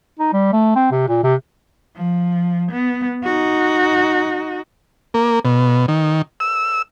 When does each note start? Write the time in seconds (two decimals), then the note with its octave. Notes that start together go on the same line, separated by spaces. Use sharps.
0.19 D#4
0.33 G3
0.53 A3
0.76 C4
0.92 C3
1.08 A#2
1.24 C3
1.95 F3
2.71 B3
3.24 D#4 F#4
5.14 A#3
5.45 B2
5.88 D#3
6.40 E6